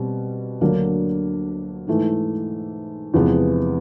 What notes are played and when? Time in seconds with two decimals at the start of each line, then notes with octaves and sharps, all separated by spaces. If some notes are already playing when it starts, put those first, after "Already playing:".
Already playing: B2 G3 C4
0.61 D2 D3 F#3 A#3 D4
1.87 G#2 E3 A3
3.14 E2 C3 F3 G#3 B3